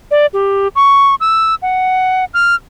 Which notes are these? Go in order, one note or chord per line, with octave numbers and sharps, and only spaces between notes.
D5
G4
C#6
E6
F#5
F6